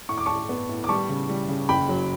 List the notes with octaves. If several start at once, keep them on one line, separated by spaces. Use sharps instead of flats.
A2 C#6
D6
A2 A5 C#6
B3
A2
D6
G3 A5 C#6
C#3
G3
C#3
F#1 G5 B5
F#3